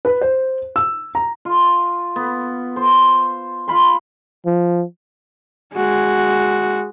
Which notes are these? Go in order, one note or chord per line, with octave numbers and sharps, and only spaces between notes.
B4
C5
E6
A#5
F4
B3
C5
F4 B5 C6
F3
G#3 F#4